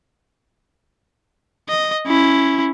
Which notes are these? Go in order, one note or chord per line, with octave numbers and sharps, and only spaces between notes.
D#5
C#4 E4